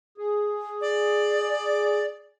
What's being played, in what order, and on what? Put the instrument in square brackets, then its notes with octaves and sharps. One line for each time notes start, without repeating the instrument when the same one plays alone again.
[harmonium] G#4
[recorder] D5